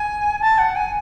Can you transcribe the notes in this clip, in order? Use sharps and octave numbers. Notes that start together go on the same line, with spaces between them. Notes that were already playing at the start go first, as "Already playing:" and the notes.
Already playing: G#5
A5
F#5
G#5